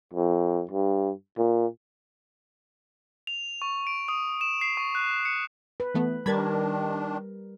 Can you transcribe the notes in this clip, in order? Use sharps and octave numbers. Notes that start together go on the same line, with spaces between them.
F2
G2
A#2
F7
C#6
D7
D#6
E7
C7
C#6
F#6
C#7
B4
E3 A3 B3
D#3 G3 D4 A#4 B5 G#6 A6